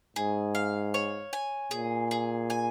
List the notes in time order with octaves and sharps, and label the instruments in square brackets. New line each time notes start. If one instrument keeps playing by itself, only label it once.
[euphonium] G#2 [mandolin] G#4
[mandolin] F5
C#5
G#5
[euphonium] A#2 [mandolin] G#4
[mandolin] G#4
G#5